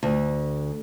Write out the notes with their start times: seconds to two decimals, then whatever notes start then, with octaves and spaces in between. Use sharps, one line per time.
0.03 D2